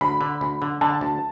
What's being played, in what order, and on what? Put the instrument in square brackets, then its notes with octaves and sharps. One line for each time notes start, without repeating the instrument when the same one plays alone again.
[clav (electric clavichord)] D2 [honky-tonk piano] B5
[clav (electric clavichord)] D3
D2
D3
[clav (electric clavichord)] D3 [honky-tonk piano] A5
[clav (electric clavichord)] D2